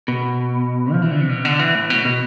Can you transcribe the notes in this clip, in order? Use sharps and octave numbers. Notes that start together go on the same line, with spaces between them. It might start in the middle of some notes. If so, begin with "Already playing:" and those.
B2
F3
E3
D3
C3
B2
D3
E3
A2
B2
B2